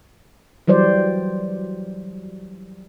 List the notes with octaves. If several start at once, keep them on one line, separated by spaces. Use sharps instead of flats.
E3 F#3 G3 C5 D5